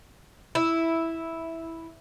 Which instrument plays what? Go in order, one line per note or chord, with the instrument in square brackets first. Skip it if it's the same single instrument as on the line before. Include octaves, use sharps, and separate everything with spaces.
[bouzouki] E4